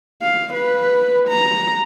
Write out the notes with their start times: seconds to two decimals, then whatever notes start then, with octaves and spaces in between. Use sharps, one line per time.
0.22 F5
0.54 B4
1.28 A#5